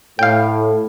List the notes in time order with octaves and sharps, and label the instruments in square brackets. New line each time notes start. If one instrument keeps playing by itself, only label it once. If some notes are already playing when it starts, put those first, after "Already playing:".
[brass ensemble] A2 [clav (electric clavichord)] F5 G5